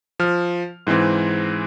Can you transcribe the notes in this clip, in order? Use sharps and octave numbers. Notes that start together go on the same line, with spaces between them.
F3 F6
G#2 E3 G#3 C4